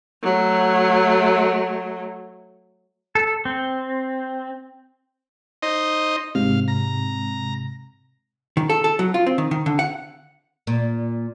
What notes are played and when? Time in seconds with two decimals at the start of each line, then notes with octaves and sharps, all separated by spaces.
0.23 F#3 A3
3.15 A4
3.45 C4
5.63 D#4 C5 D#5
6.35 G#2 C3 F5
6.68 A#5
8.57 D#3
8.70 A4
8.84 A4
8.99 F#3
9.14 F4
9.26 C4
9.38 D#3
9.51 D#3
9.66 D3
9.79 F#5
10.67 A#2